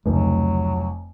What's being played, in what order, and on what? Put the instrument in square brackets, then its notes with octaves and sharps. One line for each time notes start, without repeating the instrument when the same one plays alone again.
[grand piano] F1 [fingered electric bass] C#2 C#3 A3 [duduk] F#3